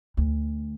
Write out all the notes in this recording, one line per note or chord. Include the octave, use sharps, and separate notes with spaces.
D2